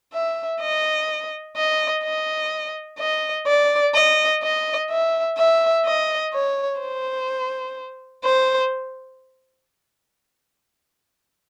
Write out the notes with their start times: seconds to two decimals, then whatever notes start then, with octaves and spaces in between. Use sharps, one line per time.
0.14 E5
0.61 D#5
1.56 D#5
2.03 D#5
2.99 D#5
3.47 D5
3.95 D#5
4.43 D#5
4.90 E5
5.38 E5
5.85 D#5
6.33 C#5
6.80 C5
8.24 C5